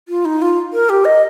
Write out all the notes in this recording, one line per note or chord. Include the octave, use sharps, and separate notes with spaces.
F4
D#4
F4
A#4
G4
D#5